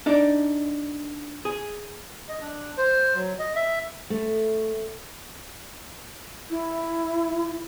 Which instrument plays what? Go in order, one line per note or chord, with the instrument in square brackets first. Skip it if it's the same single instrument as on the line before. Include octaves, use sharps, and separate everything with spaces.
[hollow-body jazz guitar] D4 D#4 D5
G#4
[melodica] D#5
D4
C5
F#3
D#5
E5
[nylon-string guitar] A3
[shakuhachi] E4